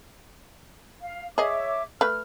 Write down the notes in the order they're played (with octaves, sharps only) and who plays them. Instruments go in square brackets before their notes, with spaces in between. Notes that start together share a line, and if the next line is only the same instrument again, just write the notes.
[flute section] F5
[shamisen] G#4 D#5 [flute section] C#5 E5 D6
[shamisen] A3 B4 [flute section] F6